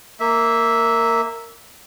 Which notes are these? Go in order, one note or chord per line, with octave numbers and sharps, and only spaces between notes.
A#3 E5